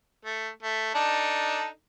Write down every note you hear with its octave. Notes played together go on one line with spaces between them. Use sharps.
A3
A3
D4 D#4 A4